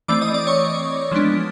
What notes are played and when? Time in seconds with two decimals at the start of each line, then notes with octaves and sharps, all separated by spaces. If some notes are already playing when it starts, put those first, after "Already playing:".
0.08 E3 A3 C4 D5 D6
0.21 D#5 D#6
0.34 D5 D6
0.47 C#5 C#6
1.12 F3 G#3 B3 D4